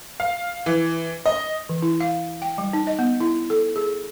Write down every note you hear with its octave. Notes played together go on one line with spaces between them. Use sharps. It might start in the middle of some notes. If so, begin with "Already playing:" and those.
F5
E3
D#5
E3
E4
F5
G5
G3
D#4
D#5
B3
E4
A4
G#4